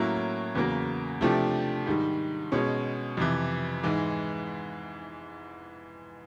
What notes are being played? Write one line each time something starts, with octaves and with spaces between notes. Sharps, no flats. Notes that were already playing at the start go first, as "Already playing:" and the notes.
Already playing: A2 F#3 A#3 C#4 E4
E2 C#3 F#3 A#3
C3 F3 A3 D4 G4
G#2 D#3 G3
B2 G#3 C#4
F2 C3 E3
G#2 E3 G#3